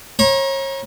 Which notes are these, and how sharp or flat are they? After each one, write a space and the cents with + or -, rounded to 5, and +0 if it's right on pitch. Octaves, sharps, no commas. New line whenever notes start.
C#5 -35 A#5 +30